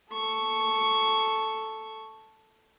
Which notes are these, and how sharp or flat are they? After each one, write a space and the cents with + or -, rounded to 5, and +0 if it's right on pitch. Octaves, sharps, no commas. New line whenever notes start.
A4 +0 C#6 +0